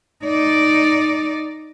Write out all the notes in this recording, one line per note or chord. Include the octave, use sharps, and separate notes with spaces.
D#4 D5